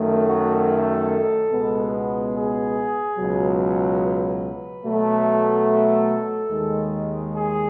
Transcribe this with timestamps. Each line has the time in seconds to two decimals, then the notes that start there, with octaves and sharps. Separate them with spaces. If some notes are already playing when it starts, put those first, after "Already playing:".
Already playing: F#2 D#3 A3
0.28 F#4
0.69 A4
1.52 C#2 B2 G#3 B3
2.36 G#4
3.18 C#2 B2 F#3
4.01 B4
4.84 B2 F#3 A3
5.67 A4
6.50 D#2 D#3 G#3
7.34 G#4